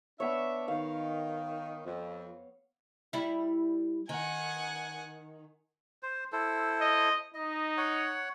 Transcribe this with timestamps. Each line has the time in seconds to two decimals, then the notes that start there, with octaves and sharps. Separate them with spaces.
0.20 B3 D4 C#5 E5
0.68 D#3 F5
1.85 F2
3.13 G3 E4
4.09 D#3 F#5 G#5
6.03 C5
6.32 E4 A4 C5
6.81 D#5
7.35 D#4 D#5
7.77 C#5 F#5